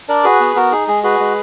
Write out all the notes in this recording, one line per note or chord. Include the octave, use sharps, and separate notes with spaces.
D4 A#4 D5
F#4 G#4 B4
B3
B3 F#4 A#4
D#4 G#4
G#3 G#4
F#4 G#4 B4
G#3